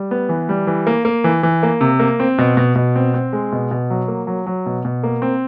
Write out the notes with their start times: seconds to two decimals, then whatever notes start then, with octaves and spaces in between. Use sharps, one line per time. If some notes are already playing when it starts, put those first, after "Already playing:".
Already playing: G3
0.11 B3
0.29 E3
0.49 G3
0.67 E3
0.87 A#3
1.05 A#3
1.24 E3
1.43 E3
1.63 A#3
1.81 C3
2.00 A#3
2.20 C4
2.38 B2
2.57 B2
2.76 B2
2.96 C4
3.14 C4
3.33 G#3
3.52 B2
3.71 B2
3.90 F#3
4.08 A#3
4.27 F#3
4.46 F#3
4.66 B2
4.85 B2
5.03 A#3
5.22 C4